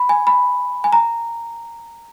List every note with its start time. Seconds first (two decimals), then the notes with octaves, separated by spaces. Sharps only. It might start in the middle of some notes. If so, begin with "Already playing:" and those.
Already playing: B5
0.09 G#5
0.27 B5
0.84 G#5
0.93 A#5